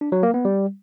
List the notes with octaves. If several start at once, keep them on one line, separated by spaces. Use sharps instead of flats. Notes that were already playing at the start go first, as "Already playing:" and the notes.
D4
F#3
A#3
B3
G3